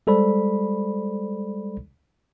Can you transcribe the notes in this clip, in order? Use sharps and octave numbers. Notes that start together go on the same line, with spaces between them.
G3 G#3 A4 C5 D5 B5